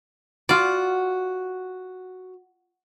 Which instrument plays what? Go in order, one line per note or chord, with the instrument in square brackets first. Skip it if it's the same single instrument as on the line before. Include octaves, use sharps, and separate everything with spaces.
[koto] F4 D5 [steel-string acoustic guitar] F#4